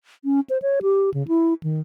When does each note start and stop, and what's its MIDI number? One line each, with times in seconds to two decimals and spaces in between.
0.24 0.40 61
0.50 0.58 72
0.62 0.79 73
0.82 1.10 67
1.14 1.26 49
1.28 1.54 64
1.63 1.81 51